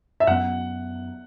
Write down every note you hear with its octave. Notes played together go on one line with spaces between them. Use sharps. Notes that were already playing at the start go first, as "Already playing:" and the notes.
E5
F#2 F#3 B3 F#5